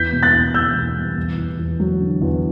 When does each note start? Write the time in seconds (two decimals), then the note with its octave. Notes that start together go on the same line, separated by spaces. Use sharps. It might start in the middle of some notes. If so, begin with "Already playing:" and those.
Already playing: E2 G6 B6
0.12 B2
0.23 F#6 A6
0.33 E2
0.54 E2 E6 G6
0.75 B2
0.96 G3
1.17 E2
1.38 E2
1.59 E2
1.80 F#3
2.00 D3
2.22 E2